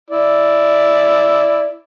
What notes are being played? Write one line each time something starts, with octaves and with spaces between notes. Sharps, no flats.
E4 D5